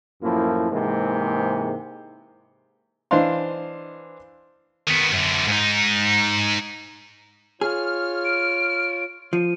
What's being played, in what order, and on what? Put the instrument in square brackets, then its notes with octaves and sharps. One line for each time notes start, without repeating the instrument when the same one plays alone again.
[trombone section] F#2 A2 F3 A#3 E4
G#2 C3 E3 G#3 A#3
[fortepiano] E3 D4 C5 D#5 F5 C6
[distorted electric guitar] D#3 B3
F#2 D3
G#2 D#4
[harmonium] F4 C#5 [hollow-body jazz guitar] G#4 [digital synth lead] F6
[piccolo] D7
[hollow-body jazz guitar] F3 [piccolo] D#7